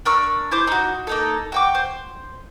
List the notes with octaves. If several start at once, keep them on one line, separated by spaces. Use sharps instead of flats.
D4 A#4 C#6 E6
E4 C5 D6
D#4 F#4
A#3 D#4 A4
F#4 G5 D6
C5